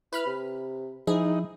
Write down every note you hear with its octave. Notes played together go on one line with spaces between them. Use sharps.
E4 B4 B5 F6
C3
F3 D#4 E4 G#4